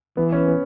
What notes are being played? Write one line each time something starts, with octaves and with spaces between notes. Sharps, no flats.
E3 B3
C#4
B3